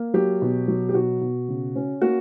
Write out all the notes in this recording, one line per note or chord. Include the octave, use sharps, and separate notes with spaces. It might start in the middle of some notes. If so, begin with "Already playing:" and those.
Already playing: A#3
F#3 G4
B2
F#3
G4
B2 F#4
B2
C#3
C#4
A#3 F#4